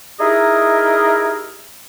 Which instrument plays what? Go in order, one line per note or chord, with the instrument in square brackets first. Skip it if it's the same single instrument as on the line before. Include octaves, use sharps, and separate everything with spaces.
[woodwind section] D#4 E4 G4 G#4 A#4 D#5